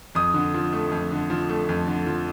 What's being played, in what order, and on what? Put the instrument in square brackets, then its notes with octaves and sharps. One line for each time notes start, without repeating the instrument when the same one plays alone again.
[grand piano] F2 D#6
D3
F3
A3
F2
D3
F3
A3
F2
D3
F3